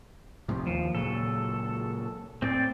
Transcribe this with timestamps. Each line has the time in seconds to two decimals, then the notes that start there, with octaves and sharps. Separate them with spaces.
0.48 A2 C3 F3
0.67 D#2 F3
0.95 A#2 C#3 F#3 A4
2.42 A2 C4 D5